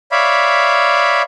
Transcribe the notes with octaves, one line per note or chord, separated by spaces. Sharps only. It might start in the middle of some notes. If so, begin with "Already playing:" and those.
C#5 D5 E5 F5 B5